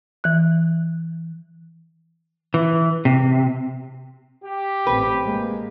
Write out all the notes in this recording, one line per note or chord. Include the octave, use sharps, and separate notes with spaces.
E3 F#6
E3
C3
G4
A1 C4 B4
G#3 A#3